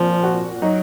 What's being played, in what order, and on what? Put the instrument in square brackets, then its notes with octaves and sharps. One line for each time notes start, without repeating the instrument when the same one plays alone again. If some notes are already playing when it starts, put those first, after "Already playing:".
Already playing: [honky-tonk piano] A#2 C4 [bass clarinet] F3
[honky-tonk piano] F#4
[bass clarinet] F#3 [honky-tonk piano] D#4